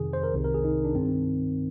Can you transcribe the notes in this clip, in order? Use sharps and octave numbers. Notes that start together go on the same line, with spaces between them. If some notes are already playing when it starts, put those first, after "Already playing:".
Already playing: F2 C3 D#3 G#4
C5
A#4
C2 C3 D#3
A#4
G#4
D#4
D4
G2 D#3 C4